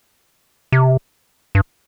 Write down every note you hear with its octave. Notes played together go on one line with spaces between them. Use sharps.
C3
G2